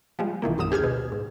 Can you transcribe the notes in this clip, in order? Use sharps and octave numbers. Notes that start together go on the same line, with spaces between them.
F3 G3 G#3
B1 D#3 E3 A#3
A#1 F#2 F#3 D#6 E7
D2 G4 G#4 F6 G#6
B2
G#2